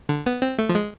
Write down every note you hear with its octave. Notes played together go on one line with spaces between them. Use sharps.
D3
B3
C4
A3
F3
G#3